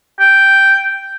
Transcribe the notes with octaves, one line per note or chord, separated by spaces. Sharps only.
G5